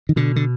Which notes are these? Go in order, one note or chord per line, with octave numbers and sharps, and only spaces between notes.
D#3
B2 D3
D3